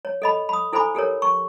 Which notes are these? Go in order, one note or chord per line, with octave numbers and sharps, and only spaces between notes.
C#5
A4 D#5 B5
B5 D#6
E4 A4 C5 G#5 B5 D6
G4 A4 A#4 C#5
C#6